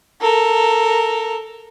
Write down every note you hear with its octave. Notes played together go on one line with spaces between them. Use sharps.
A4 A#4